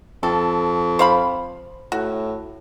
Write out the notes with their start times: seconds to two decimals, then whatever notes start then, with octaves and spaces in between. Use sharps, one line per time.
0.23 F2 A4
0.99 C5 F5 B5
1.92 A2 F#4